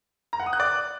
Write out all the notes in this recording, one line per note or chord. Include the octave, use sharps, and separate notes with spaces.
A#5
F#5
D#6
F#6
D5